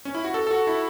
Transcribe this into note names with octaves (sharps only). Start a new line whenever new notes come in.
C#4
E4
F#4
A4
A4
F#4
E4